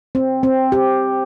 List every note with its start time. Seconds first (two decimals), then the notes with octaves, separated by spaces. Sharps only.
0.15 C4
0.43 C4
0.72 G4